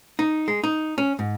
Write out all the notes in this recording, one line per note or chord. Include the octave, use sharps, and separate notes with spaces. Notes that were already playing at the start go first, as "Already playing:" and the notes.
D#4
G#3
D#4
C#4
G#2